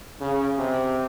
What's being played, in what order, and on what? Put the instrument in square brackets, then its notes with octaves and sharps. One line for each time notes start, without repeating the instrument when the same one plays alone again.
[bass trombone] C#3
C3